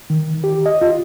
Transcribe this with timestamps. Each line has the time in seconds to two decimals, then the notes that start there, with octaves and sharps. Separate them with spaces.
0.10 D#3
0.44 G4
0.66 D#5
0.81 F4